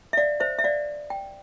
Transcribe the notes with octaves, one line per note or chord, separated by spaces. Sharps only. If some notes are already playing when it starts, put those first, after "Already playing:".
E5
D5 F5
C5 E5
E5
D5 F5
G5